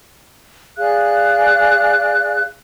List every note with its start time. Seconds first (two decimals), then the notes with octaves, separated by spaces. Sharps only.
0.78 G#4 D5 F5 F#6